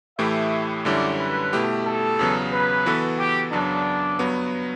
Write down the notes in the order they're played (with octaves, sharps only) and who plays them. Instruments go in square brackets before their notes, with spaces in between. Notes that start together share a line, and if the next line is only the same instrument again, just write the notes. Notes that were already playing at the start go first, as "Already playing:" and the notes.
[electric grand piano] A2 E3 A3 E4 G4 [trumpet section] E5
[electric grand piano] F#2 D3 G3 C#4 E4 [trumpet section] D5
[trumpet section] B4
[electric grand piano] B2 A3 E4 G4
[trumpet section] A4
[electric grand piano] E2 C#3 F#3 B3
[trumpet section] B4
[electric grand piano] E3 B3 F#4 A4
[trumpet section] G4
[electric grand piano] F#2 C#3 F#3 B3 [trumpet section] D4
[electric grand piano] G2 F#3 B3